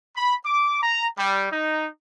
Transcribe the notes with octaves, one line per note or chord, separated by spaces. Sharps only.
B5
D6
A#5
G3
D#4